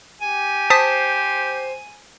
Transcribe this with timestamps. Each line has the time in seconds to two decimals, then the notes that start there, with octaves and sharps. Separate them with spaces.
0.21 G4 G#5
0.70 C5 A5 D#6 B6